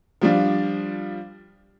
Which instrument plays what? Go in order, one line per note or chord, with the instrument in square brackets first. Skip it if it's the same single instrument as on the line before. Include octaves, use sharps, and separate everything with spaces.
[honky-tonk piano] F3 G3 D4 F4